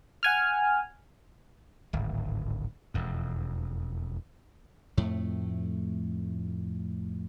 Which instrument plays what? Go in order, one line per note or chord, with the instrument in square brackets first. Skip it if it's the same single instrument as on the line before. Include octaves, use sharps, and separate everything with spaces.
[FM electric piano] F#5 G#5 F6
[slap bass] D1 G#1
E1 F2
F2 A2 A3